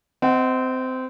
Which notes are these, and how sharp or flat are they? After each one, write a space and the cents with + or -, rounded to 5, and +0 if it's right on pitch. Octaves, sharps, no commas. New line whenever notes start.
C4 -20 D#5 +25 F#5 +20